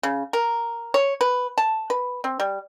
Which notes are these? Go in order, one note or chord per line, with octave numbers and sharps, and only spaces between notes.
C#3
A#4
C#5
B4
A5
B4
C4
G3